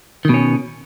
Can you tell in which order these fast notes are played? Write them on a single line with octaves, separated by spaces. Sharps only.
D#3 B2 C#4